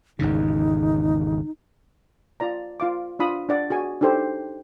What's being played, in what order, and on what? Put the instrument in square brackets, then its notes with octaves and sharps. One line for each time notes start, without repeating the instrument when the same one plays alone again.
[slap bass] G#1 E2 C#3 [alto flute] D#4
[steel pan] F4 D5 A#5
F4 F5 D6
D4 F4 B5 D#6
D4 D5 F#5
F#4 G#4 G#5
D4 D#4 G4 A4 C5